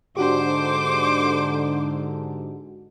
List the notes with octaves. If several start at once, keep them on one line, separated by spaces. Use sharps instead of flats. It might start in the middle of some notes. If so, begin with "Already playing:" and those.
G#2 D3 D4 F#4 G4 C5 D6